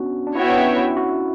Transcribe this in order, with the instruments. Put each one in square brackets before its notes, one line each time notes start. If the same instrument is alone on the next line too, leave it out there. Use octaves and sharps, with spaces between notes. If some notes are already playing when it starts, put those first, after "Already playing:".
Already playing: [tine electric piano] B3 C#4 D4 F#4
D4
[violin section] B3 F#4 C#5 E5 G5 [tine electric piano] E4
[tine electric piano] D4
C#4
E4
F#4